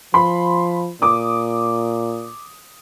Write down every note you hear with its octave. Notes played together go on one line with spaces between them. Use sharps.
F3 B5 C6
A#2 D6 D#6